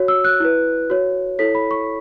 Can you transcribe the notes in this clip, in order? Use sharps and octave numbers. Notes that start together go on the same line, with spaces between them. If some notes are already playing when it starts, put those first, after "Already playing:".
Already playing: F#4 C#5
E6
F#6
E4 B4
F#4 C#5
E4 A4 C#5 B6
B5
C#6